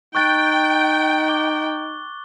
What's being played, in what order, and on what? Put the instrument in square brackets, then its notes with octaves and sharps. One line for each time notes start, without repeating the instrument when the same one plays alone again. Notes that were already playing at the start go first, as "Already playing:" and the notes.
[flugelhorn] D#4 [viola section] G5 [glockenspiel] C#6 F#6 A6
[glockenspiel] D6 G7